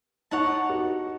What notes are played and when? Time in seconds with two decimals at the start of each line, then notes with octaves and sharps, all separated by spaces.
0.31 D#4 C#5 F#5 A5
0.70 F#4